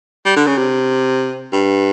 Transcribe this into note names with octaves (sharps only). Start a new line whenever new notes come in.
G3
D3
C#3
C3
G2